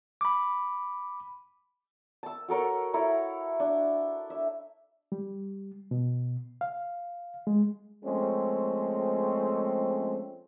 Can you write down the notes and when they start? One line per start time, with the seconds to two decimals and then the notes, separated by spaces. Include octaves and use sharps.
0.21 B5 D6
2.23 A5 E6
2.48 F#4 A4 A#4 C#5
2.94 E4 A4 A#5
3.60 D4
4.30 E5
5.12 G3
5.91 B2
6.61 F5
7.47 G#3
8.05 F3 G#3 A3 C4 C#4